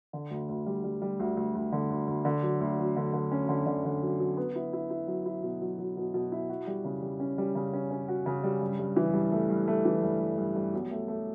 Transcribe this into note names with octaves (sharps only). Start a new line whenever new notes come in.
D3
D2
D2
G3
G3
G3
D2
D2
D2
D3
D2
D2
D3
F#3
D2
F#3
D3
D3
C#4
D3
D3
D3
F#3
F#3
B3
E4
E4
E4
F#3
E4
B2
F#3
F#3
B2
B2
E4
F#4
G3
C#3
G3
C#4
G3
C#3
C#4
C#4
F#4
C#3
G3
G2
G2
E3
G2
A3
G2
A3
E3
G2
G2
G2
G2
B1
A3
A3